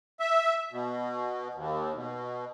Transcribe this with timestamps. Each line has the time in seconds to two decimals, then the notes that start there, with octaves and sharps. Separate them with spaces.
0.20 E5
0.72 B2
1.54 D#2
1.95 B2